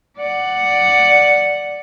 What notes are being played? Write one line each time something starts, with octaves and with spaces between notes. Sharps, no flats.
D5 F#5